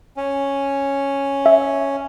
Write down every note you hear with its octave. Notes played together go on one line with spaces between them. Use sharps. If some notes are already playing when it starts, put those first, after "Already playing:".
C#4
E5